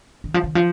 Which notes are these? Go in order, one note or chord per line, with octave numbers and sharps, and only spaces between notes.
D#3
F3
D#3
F3